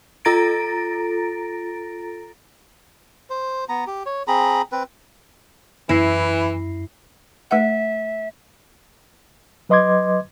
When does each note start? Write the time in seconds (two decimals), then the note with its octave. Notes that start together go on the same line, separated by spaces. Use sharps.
0.25 F4 A4 A#5 A6 A#6 D7
3.30 C5
3.69 B3 A#5
3.87 G4
4.06 C#5
4.28 C4 G#4 A#5 B5
4.72 C4 B4
5.89 F#2 E3 E4 A#6 C7
7.51 A3 B4 E5 F#5
9.69 F#3 B4 D#5 C6 D6 G#6